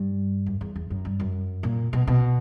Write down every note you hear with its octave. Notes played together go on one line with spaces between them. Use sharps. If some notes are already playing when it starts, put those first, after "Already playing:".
Already playing: G2
F#2
E2
E2
F#2
G2
F#2
A#2
B2
B2